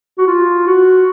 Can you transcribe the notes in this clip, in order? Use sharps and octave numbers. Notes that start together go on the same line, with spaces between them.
F#4
F4
F#4